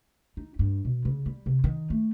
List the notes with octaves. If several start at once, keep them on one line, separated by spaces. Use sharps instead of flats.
D#4
G2
B2
C#3
G3
C3
D#3
A3